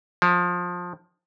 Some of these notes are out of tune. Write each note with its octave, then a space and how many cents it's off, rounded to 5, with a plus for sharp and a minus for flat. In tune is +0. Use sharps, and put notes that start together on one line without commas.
F3 +20